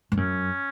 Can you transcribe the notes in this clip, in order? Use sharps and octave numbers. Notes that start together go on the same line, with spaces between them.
G2
F#2 C#4